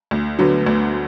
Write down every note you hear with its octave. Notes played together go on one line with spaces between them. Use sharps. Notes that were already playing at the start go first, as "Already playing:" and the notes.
D2
D3 F#3 B3
D2